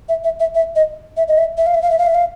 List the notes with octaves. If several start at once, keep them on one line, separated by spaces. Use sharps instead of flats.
E5
E5
E5
E5
D#5
E5
D#5
E5
E5
F5
E5
F5
E5
F5
E5
F5